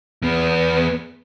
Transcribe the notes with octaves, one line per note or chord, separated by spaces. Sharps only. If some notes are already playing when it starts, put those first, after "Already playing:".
E2 B3